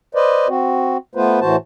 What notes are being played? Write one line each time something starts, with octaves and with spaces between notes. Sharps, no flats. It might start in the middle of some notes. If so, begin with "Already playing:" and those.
B4 C5 D5 D#5
C4 F#4
A3 B3 F4 B4 C5
A2 E3 F#4 C5 A5